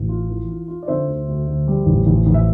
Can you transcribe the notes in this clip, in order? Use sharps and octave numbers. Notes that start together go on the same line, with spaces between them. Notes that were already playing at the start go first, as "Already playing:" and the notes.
Already playing: A1
F4
E3
F4
F4
D5
D3 C5 E5
D2
D2
D2
G3
A1
A1
A1
E5